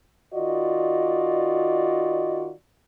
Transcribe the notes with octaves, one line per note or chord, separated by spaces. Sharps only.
D#3 F4 F#4 D5 D#5